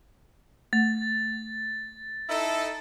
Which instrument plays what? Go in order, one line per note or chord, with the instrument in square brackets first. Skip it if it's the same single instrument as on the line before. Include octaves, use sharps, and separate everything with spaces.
[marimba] A3 [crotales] A6
[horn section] D#4 E4 A4